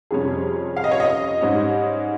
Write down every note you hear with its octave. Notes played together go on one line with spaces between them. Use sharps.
F2 C3 G3 C#4 G#4
F5
D#5
C#5
D#5
G#2 G3 C#4